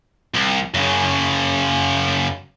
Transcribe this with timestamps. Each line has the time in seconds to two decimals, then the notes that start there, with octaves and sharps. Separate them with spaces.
0.34 C2
0.74 F#2 C#3